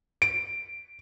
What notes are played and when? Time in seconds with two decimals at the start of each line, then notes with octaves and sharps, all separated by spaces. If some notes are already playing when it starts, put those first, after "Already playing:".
0.22 D7